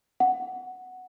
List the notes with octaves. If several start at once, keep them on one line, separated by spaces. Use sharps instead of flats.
F#5